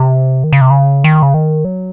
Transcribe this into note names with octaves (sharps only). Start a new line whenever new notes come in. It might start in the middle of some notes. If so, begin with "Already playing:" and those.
Already playing: C3
D#3
C#3
C3
C#3
D#3
C#3
D#3
F#3